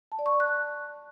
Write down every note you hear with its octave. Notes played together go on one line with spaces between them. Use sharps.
A5
D5
C#6
D5
F#6